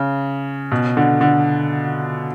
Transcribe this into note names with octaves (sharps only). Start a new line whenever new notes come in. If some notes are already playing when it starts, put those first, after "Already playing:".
Already playing: C#3
B2
D3
D3